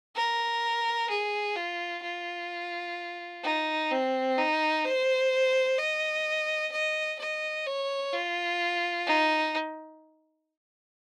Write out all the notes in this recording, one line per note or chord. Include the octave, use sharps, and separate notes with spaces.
A#4
G#4
F4
F4
D#4
C4
D#4
C5
D#5
D#5
D#5
C#5
F4
D#4